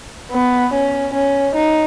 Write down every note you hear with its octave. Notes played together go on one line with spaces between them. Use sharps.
B3
C#4
C#4
D#4